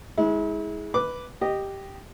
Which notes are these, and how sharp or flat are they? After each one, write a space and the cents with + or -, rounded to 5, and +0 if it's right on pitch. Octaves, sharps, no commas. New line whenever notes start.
G#3 +0 E4 -35
B4 +0 D6 -5
G4 +0 D#5 -10